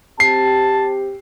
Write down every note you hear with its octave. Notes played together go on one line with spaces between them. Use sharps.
C4 G4 A5 C7